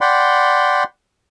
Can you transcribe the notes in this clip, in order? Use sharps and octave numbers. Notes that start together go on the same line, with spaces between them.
D5 F#5 G5 B5 C6